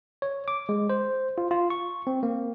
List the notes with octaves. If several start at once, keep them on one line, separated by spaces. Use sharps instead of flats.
C#5
D6
G#3
C5
F4
F4
C#6
C4
A#3